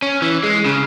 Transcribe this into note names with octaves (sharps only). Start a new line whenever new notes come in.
C#4
E3
G#3
C#3